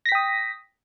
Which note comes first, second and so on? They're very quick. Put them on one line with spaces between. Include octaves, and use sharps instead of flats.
A#6 B6 G5 D#6